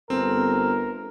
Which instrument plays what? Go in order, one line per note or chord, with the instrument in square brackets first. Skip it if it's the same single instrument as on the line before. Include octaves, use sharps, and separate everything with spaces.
[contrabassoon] G1 [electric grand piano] C4 [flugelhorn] A#4